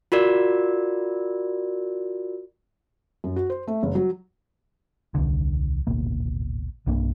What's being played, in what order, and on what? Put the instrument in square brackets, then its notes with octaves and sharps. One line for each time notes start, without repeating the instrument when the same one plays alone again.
[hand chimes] F4 F#4 A#4 D5
[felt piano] F#2
F#4
C5
A3
F#1
F#3
[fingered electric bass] D#1 C2 D3
D1 G#1 B2 A#3
B1 G2 A#3 D4